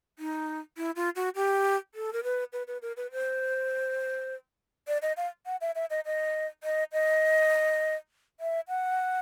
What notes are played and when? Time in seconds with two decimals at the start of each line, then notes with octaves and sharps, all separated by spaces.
0.19 D#4
0.77 E4
0.96 F4
1.16 F#4
1.35 G4
1.95 A4
2.13 A#4
2.24 B4
2.53 B4
2.68 B4
2.82 A#4
2.97 B4
3.12 C5
4.88 D5
5.02 D#5
5.17 F5
5.46 F#5
5.61 E5
5.75 E5
5.90 D#5
6.05 D#5
6.63 D#5
6.93 D#5
8.40 E5
8.68 F#5